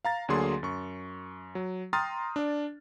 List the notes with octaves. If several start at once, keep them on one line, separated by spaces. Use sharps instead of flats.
F5 A#5 A6
D2 D3 F#3 A#3 G#4 C6
F#2 C#6
F#3
G5 A#5 C6 D#6 F6 A6
D4 D5